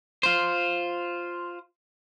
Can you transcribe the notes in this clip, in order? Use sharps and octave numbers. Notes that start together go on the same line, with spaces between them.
F4 C5